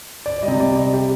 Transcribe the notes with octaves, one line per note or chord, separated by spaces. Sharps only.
D5
G3 D#5
C3
D5
D#5
G4